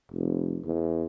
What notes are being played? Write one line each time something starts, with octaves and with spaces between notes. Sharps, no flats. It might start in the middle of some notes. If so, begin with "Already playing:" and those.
F1
E2